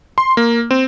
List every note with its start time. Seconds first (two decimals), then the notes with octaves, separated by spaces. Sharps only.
0.18 C6
0.37 A#3
0.71 C4